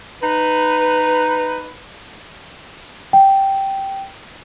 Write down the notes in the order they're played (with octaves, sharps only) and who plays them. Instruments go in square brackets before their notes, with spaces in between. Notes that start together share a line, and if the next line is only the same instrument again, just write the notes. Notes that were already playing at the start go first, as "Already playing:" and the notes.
[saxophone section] D#4 B4
[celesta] G5